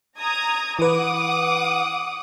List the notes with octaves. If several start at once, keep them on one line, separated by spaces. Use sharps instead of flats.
A#5 D#6 G#6
E3 B4 F#5 D6 D#6